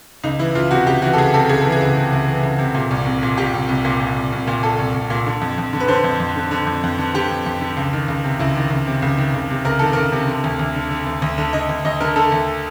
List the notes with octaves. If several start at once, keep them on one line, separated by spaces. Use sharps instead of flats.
C#2 D#4
E3 E4
C#2 F4
C3 F#4
C#2 G4
E3 F#4
A4
C#2 G#4
C3 A4
C#2 G#4
E3 A4
G#4
C#2
C3
C#2
E3
C#2
C3
A#2
C2
C2
A#2
A#2 G4
C2
C2
A#2
A#2
C2
C2
A#2
A#2 A4
C2
C2
A#2
D3
F2
F2
D3
B4
D3 C5
F2
F2
D3
D3
F2
F2
D3
D3 G4
F2
F2
D3
C#2
D#3
C#2
C3
C#2 E4
D#3
C#2
C3
C#2
D#3
C#2
C3
C#2 A#4
D#3 A4
C#2 A#4
C3
D3
D2
D2
D3
D3
D2
D2
D3
D3 D#5
D2
D2 D#5
D3 A#4
D3 A4
D2